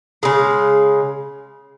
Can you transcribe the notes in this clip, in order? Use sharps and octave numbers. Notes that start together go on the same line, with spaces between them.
C#3 G#3